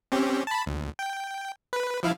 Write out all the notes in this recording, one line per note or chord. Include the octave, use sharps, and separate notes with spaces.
C4 C#4 G4
A5 B5
D2
G5
B4
F3 E4 F5